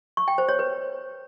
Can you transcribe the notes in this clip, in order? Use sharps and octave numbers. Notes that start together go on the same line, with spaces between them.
C#6
G5
C5
C#5
B4